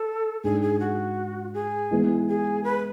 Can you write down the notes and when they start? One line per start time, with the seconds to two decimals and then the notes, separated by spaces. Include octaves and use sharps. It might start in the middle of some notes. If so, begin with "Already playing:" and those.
Already playing: A4
0.43 G#2 G#3 D4 G#4
0.62 G#4
0.80 F#4
1.54 G#4
1.91 E3 G#3 B3
2.28 G#4
2.64 B4